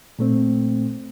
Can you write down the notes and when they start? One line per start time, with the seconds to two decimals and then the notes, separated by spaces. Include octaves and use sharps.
0.19 A#2 A3 C4